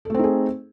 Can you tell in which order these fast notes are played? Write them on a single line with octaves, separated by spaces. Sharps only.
A4 A3 C4 D#4 G#4